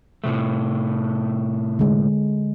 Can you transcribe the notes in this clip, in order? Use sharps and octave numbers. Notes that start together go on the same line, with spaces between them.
A2 C3 A3
D3 G#3